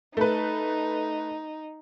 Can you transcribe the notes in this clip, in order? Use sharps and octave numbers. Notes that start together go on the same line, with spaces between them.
A3 D#4 B4